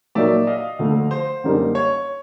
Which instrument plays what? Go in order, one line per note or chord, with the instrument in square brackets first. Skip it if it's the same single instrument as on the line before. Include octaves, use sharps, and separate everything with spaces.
[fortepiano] A#2 F#3 A#3 D#4 [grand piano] D5 E5
[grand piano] D#5 F5
[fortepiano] D2 D3 F3 A3
[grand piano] C5
[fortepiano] F#2 D3 G3 A#3 D#4
[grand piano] C#5